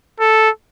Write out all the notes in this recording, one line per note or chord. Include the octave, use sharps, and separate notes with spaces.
A4